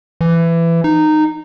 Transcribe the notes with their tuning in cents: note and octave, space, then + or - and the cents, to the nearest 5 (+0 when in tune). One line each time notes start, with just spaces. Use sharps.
E3 +20
D#4 -15